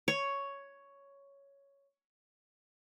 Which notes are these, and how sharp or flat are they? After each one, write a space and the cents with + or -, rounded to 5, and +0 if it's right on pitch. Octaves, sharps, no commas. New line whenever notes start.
C#5 +5